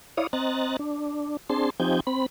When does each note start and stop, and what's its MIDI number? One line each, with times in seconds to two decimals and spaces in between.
0.17 0.27 64
0.17 0.27 73
0.17 0.27 74
0.17 0.27 77
0.17 0.27 87
0.33 0.77 60
0.33 0.77 75
0.33 0.77 82
0.33 0.77 90
0.33 0.77 93
0.79 1.37 62
1.50 1.70 60
1.50 1.70 62
1.50 1.70 68
1.50 1.70 81
1.50 1.70 84
1.80 2.00 53
1.80 2.00 60
1.80 2.00 63
1.80 2.00 67
1.80 2.00 80
1.80 2.00 91
2.07 2.26 60
2.07 2.26 83